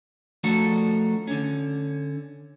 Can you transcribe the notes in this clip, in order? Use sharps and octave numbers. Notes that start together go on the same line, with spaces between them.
F3 A3 D4 F#4 A4 A#4
D3 C#4